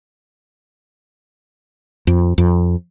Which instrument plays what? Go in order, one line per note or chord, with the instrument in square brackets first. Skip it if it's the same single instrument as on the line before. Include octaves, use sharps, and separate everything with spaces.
[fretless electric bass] F2
F2